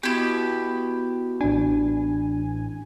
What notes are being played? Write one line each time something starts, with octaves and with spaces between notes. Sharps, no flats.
B2 E4 G4
A1 D4 G#5